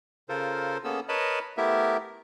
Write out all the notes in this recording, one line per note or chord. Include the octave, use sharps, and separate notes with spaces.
C#3 F4 A4 A#4 C5
A#3 B3 C#4 G#4 A4 E6
A#4 B4 C#5 D#5 A5 B5
A3 B3 E4 G4 A#4 E5